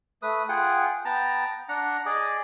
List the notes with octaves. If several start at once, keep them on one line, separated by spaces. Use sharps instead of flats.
A3 B4 D#6
F4 G#4 F#5 G5
B3 G5 A5 A#5
D4 F#5 A#5
G#4 D5 D#5